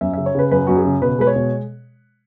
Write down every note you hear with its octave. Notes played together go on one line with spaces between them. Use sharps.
F#2 E5
C#3 E5
C#5
C#3 B4
F#2 B4
F#2 F#4
G#4
C#3
B2 B4
G#3 B4
C#5
B2